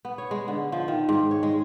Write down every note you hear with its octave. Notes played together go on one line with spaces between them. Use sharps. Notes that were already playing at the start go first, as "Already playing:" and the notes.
B3
C#5
G#3
D3
F3
D#3
G#2
C#5
G#3